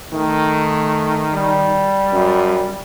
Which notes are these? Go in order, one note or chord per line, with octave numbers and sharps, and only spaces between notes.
D#3 A3
G3
F#2